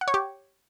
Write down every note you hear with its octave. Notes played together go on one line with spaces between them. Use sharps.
F#5
C#5
G4